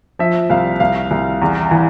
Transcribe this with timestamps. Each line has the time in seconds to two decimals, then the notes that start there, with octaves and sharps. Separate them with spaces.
0.19 F3 E5
0.50 C2 F5
0.80 C2 F5
1.11 C2
1.42 E2
1.71 E3